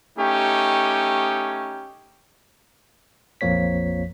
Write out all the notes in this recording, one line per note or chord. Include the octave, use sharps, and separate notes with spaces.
A3 C#4 D#4 G4
A#1 F2 F3 A#3 C#5 B6